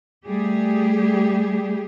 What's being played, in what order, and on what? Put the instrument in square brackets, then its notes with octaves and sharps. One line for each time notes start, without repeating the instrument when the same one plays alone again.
[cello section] G3 A3 G4 G#4